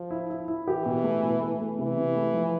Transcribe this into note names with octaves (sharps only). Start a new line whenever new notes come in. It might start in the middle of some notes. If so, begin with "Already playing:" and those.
Already playing: F3
E4
E4
E4
E3 G4
B2
A3
B2
A3
A3
C3 E3
C3
A3
F3